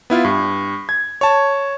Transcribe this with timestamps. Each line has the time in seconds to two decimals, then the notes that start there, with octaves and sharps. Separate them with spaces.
0.10 B3 E4 F4
0.24 G2
0.89 G#6
1.21 C#5 A5